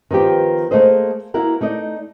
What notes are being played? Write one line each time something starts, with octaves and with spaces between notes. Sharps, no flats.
D#3 F3 B3 G4
A3 A#3 G#4 C5 D#5
A#3 E4 F#4 A#4 F#5
A3 D#4 D5 D#5